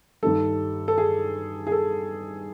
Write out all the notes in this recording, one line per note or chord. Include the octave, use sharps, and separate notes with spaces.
G2 D#3 G3 A4
A4
G#4
G#4
A4